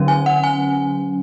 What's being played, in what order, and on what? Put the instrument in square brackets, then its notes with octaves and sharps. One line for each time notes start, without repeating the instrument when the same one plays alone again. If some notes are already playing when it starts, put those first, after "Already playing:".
Already playing: [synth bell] D3 F#3 C#4
G#5
F#5
G#5